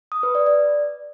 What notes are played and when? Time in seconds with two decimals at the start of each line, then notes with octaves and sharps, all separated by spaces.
0.12 D#6
0.23 B4
0.35 D5
0.46 D5